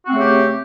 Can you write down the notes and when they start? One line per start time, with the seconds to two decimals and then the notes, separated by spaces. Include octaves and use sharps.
0.05 F#4
0.08 C4
0.11 A3
0.15 C#3
0.18 G4